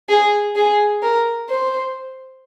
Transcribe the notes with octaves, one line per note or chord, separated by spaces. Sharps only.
G#4
G#4
A#4
C5